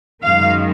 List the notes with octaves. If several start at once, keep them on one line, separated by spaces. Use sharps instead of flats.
F#2 D#3 G#3 F5